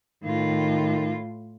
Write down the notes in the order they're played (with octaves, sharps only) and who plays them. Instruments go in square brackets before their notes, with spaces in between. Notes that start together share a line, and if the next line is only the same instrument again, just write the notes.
[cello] A2 F4 [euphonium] D#3